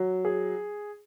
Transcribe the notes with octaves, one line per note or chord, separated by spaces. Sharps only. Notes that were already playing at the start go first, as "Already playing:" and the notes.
Already playing: F#3
G#4